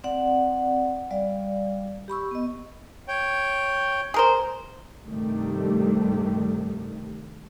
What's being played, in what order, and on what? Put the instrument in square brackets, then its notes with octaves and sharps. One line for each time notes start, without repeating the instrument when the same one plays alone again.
[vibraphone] C4 D5 F#5
G3 D5 F5
G4 B5 C#6 E6
B3 D#5
[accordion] C#5 G5
[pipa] G#4 A#4 C5
[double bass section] G2 C3 D#3 G3 A3